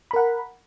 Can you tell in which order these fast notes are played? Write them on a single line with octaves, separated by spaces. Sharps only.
B5 A#4 F#5